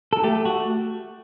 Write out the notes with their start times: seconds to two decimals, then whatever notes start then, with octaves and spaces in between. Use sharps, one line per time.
0.13 A4
0.24 A3 G4
0.45 F#4